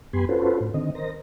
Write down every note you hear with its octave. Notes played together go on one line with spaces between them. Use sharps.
F#2 B3 G4 G#5 B5 C6
C#4 F4 F#4 A4 B4 C5
A2
D3 D#3 C4 D#5
A#4 C5 D#5 A#6